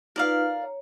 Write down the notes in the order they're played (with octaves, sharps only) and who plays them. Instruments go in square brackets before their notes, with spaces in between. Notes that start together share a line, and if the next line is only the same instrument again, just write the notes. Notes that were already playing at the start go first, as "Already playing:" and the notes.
[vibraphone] D#4 F4 B4 [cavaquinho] A#4 D5 F5
[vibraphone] A#5
C#5